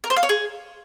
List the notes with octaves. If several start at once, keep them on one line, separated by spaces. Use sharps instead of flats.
A#4
C5
F5
C#5
G#4